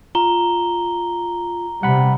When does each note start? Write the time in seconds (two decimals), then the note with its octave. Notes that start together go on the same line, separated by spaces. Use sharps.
0.15 F4 A#5 G7
1.83 C3 G3 F#5 B5